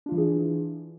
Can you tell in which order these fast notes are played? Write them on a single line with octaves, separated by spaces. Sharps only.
D4 F4 E3 E4 G#4